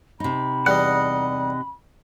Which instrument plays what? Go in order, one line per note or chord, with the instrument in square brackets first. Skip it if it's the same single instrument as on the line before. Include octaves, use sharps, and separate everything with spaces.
[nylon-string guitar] C3 D#4 [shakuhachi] B5
[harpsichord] E2 G3 [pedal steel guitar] D#5 F#5